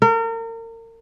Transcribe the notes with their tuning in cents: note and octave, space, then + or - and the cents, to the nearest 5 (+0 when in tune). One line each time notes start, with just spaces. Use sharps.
A#4 -35